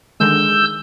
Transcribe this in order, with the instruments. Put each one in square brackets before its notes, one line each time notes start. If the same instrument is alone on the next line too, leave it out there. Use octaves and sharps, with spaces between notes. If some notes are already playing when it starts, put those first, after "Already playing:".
[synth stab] D3 D#3 G#3 [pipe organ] E6 G6